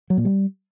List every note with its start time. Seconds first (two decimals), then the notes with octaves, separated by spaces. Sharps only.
0.10 F#3
0.18 A#2
0.25 G3